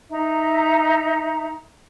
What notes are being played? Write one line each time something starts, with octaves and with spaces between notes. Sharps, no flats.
D#4 E5 A#5